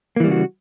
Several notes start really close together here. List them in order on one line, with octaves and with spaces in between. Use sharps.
A#3 E3 G3 C#3 F#4